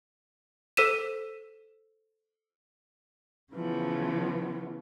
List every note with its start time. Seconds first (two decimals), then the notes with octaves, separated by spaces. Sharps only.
0.77 A4 C5 E6 B6 D#7 E7
3.53 C#3 E3 F3 B3